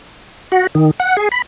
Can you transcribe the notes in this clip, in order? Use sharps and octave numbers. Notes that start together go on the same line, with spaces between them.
F#4
D#3
F#5
G#4
B5